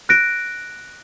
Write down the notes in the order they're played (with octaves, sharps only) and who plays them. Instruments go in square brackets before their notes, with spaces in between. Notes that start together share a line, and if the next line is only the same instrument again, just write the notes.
[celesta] F#6 A#6 D7